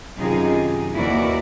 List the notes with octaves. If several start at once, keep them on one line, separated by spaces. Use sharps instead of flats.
F#2 C3 D#3 D#4 F4 G#4
D#2 E3 E4 F#4 A#4 D5